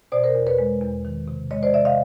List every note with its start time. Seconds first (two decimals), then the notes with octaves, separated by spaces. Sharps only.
0.12 B2 C5 D5
0.23 A#4 C5
0.35 E2
0.47 B4 C#5
0.59 G#3
0.81 E2
1.05 D#3
1.28 C3
1.51 G#3 C#5 D#5
1.63 C5 D5
1.74 C3 D5 E5
1.85 D#5 F5